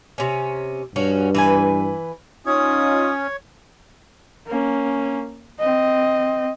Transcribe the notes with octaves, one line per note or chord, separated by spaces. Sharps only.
C3 C#4
G2 F3 C#4 F#4
E3 B4 G#5
C#4 D#4 F4 C#5 D#6
A#3 C#4
C4 D#5